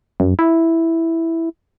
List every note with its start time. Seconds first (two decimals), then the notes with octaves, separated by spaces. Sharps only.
0.20 F#2
0.39 E4